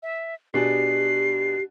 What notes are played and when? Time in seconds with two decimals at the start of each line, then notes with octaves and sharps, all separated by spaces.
0.03 E5
0.54 B2 D4 G4 G#4 C7